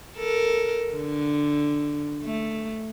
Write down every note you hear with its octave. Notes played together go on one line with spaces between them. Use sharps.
A4 A#4
D3
A3